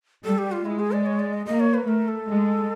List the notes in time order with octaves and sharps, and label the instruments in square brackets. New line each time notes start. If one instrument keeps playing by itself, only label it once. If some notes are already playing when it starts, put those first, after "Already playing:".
[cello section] G3 [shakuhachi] A4
[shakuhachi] G4
F4
[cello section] G#3 [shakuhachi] E4
[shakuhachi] G#4
D5
C#5
D5
D#5
[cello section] A#3 [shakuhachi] D#5
[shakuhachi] C#5
B4
[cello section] A3 [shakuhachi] A#4
[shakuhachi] A4
[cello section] G#3